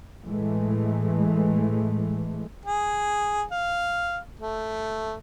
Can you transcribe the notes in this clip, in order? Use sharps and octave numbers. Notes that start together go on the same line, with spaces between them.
A2 E3 G#3 A3
G#4
F5
A3